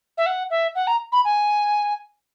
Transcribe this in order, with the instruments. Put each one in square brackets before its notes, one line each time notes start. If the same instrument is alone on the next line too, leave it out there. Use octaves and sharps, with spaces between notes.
[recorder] E5
F#5
E5
F#5
A#5
B5
G#5